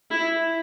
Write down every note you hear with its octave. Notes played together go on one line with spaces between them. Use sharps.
E4